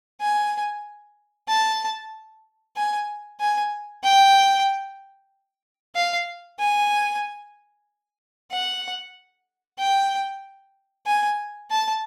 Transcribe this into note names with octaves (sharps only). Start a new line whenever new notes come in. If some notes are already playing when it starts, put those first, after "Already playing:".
G#5
A5
G#5
G#5
G5
F5
G#5
F#5
G5
G#5
A5